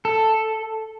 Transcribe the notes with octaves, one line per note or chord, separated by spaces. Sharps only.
A4